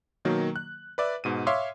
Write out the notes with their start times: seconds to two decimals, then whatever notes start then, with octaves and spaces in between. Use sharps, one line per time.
0.25 B2 D#3 F#3 A#3
0.56 F#6
0.98 B4 D5 E5
1.24 G#2 B2 D#7
1.47 C#5 E5 F5 C6 D6